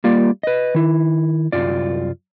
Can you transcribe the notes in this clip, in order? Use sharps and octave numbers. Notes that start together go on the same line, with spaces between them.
G3 A#3 F4 D5
B4 D#5
D#3 E4
C2 F#2 F4 D5